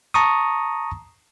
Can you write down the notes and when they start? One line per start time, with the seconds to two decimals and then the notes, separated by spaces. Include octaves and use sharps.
0.14 A5 A#5 C#6 D#6